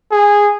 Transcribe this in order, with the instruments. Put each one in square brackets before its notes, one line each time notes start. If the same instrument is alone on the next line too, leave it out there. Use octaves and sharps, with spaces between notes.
[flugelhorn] G#4